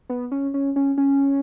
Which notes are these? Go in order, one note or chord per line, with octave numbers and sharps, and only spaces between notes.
B3
C#4
C#4
C#4
C#4